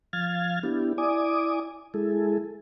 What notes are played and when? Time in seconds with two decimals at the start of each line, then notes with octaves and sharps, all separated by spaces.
0.13 F3 F5 F6 G#6 A6
0.63 B3 D4 E4 G4
0.98 E4 D5 G#5 D6 D#6
1.94 G#3 E4 G#4 A4